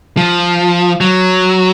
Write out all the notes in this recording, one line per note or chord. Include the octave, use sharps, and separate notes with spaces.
F3
F#3